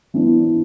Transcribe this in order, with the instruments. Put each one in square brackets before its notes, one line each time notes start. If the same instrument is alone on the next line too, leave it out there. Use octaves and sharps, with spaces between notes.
[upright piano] E3 B3 D4